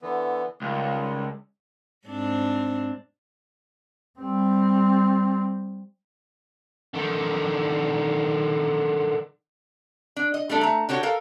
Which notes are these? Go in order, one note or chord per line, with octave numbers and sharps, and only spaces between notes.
D3 E3 B3
C#2 D#3 G3
G#2 C4 D4
G3 C4
D3 D#3
D4
D#5
G3 A3 D4 A4
A3 A#5
D3 F#4 G4 C#5
A4 A#4 F5